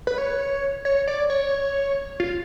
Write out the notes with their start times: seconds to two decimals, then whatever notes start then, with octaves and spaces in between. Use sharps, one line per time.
0.07 B4
0.18 C#5
0.85 C#5
1.07 D5
1.30 C#5
2.20 F4